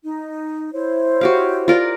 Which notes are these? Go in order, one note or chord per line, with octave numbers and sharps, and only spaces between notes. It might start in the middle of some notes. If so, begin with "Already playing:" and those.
D#4
E4 C5 C#5
F#4 G4 F5
F4 A#4 D5